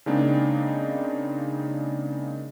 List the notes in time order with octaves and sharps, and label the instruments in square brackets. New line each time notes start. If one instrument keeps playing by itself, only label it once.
[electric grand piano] C#3 G#3 A#3 C4 D4 D#4